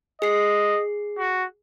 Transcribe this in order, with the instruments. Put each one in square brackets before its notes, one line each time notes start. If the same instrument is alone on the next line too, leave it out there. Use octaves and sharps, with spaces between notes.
[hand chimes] G#4 C7 [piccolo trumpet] D#5
[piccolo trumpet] F#4